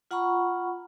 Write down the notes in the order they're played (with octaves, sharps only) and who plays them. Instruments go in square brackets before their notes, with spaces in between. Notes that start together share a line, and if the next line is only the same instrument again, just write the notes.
[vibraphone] F4 F#5 A#5 B5 C#6